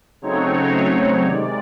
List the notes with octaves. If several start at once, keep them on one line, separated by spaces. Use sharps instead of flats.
C#3 F#3 A3 C4 D#4 C#5
C3 D#3 G#3 D5